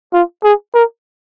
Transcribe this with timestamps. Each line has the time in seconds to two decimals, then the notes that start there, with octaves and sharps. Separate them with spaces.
0.13 F4
0.44 G#4
0.74 A#4